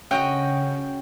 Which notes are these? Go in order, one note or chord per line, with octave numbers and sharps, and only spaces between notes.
C#3 C#4 F#4 D#5 G5